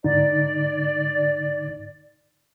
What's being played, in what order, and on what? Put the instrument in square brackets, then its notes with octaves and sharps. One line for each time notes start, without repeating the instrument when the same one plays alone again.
[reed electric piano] G#2 D3 D#4 [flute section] D5